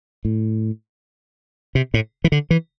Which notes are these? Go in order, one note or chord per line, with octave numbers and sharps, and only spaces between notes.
A2
C3
A2
E3
D3
E3